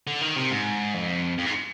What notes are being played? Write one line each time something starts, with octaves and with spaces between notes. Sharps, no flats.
D3
D#3
C3
G#2
F2
F2
G#2